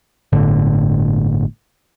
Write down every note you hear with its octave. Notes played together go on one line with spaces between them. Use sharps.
G1 A2 D3